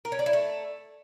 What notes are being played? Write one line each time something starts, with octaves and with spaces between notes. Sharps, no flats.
A#4
C#4
D5
E4
A3